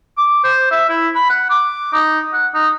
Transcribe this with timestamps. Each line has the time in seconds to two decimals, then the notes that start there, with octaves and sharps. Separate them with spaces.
0.17 D6
0.44 C5
0.71 E5
0.89 E4
1.15 B5
1.30 F#5
1.50 D6
1.93 D#4
2.33 F#5
2.54 D#4